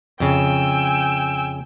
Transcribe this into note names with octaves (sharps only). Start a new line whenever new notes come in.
F2 C#3 G5 G#5 E6